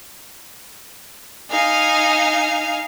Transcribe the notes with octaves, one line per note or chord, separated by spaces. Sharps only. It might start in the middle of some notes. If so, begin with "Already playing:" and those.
D#4 F5 G#5